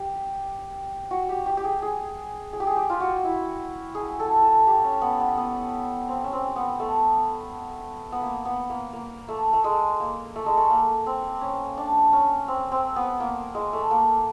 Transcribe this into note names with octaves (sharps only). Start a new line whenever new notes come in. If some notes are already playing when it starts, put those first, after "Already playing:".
Already playing: G4
F#4
G4
G4
G4
G#4
G#4
G#4
G4
G#4
G4
F4
F#4
E4
G#4
A4
A4
G4
C#4
B3
B3
B3
C4
C#4
C4
B3
A3
B3
A#3
B3
A#3
A#3
A3
A3
G#3
A#3
A3
G#3
A3
A#3
C4
C#4
D4
C#4
C4
C4
B3
A#3
G#3
A3
A#3